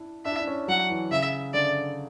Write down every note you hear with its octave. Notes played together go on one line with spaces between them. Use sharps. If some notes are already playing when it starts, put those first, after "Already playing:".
Already playing: D4 E4
D4 E5
E4
D4
C#4
F#3 F#5
E3
C#3 E5
D3 D5